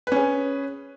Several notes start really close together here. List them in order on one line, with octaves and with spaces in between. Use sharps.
B4 C#4 G#4